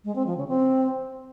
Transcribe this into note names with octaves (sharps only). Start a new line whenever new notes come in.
G#3
C4
F3
C#3
C4